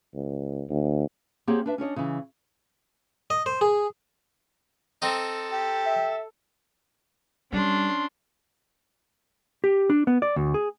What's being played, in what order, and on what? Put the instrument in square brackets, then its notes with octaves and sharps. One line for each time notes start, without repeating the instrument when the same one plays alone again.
[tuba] C#2
D2
[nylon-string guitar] A#3 C4 G4 G#4 C#5 F#5
D4 B4 E5
C#4 D4 C#5 D#5
C#3 E3
[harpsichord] D#5
C5
G#4
[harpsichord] C4 D#4 [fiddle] A4
[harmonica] G4
[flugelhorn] E5
[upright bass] G3 [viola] C#4 C6 [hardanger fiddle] D4
[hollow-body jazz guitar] G4
D4
B3
D5
D2
G#4